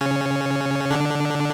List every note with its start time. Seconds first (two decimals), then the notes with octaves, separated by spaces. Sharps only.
0.01 C#3 C#4
0.90 D3 D4